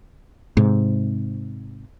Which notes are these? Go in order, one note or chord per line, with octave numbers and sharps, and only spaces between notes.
G#2 C3